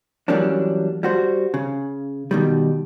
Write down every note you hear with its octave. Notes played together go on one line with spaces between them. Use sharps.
E3 F#3 G3 A#3 C#4 D4
G3 F#4 C5
C#3
B2 D#3 G3